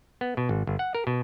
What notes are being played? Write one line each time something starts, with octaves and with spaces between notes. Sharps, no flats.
B3
B2
G#1
G1
F#5
A#4
B2